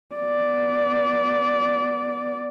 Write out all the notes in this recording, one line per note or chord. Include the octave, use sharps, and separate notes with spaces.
B3 D5